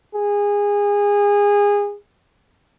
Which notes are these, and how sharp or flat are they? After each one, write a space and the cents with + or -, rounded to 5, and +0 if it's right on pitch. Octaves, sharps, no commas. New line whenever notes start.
G#4 -25